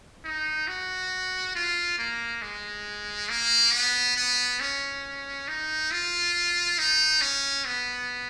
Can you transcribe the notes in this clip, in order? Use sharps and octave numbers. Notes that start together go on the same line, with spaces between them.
D#4
F#4
F4
A#3
G#3
A#3
B3
B3
C#4
D#4
F4
D#4
C#4
B3